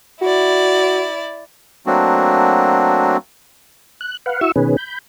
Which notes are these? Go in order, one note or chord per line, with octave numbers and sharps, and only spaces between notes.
E4 F#4 D5
F#3 A3 A#3 C4 D4 F#4
F#6
B4 F5 F#5
E4 F#4 E5 C#6 E6
B2 D#3 C#4 G#4 B4
B5 G6